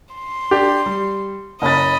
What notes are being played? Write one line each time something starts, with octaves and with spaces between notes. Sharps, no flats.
C6
D4 G4
G3
F#1 C#4 D#5 B5 A6